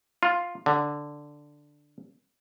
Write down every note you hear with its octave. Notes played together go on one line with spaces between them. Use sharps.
F4
D3